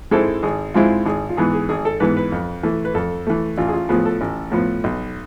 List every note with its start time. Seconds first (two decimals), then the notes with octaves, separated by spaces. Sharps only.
0.11 G#2 G#3 C4 E4 A4
0.43 G#1 G#4
0.74 G#2 G#3 C4 E4 F4
1.06 G#1 G#4
1.29 F4
1.37 G#2 E3 B3 G#4
1.53 G#4
1.69 G#1 G#4
1.85 A4
2.00 G#2 E3 B3 B4
2.17 B4
2.32 F2
2.63 E3 A3
2.85 B4
2.95 F2 A4
3.27 E3 A3
3.57 A1 F4
3.68 G#4
3.73 F4
3.89 A2 F3 B3 G#4
4.05 A4
4.21 A1
4.52 A2 F3 B3
4.84 B1